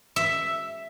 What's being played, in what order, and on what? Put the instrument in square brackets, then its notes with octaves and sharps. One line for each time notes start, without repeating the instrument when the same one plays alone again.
[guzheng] E5